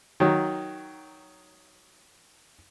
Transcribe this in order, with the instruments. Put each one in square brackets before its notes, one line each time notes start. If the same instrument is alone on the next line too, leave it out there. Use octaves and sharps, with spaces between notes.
[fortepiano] D#3 F#3